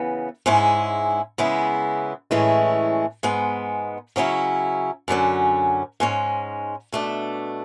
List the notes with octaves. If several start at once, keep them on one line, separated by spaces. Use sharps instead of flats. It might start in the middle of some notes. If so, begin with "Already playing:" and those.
Already playing: C#3 E3 B3
G#2 G#3 C#4 E4
C#3 G#3 B3 E4
A2 E3 G#3 C#4 E4
G#2 G#3 B3
C#3 F#3 C#4 E4
F#2 D3 F#3 C#4
G#2 G#3 C#4
B2 A3 D4